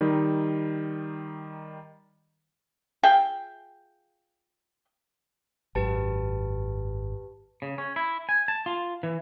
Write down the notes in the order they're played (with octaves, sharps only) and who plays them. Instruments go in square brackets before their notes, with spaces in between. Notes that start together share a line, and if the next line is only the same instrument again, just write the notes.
[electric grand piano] D#3 G3 D#4
[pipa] F4 G#4 E5 G5
[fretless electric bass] G#1 F#2 [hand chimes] G4 B4 A5
[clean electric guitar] C#3
C#4
E4
G#5
A5
F4
E3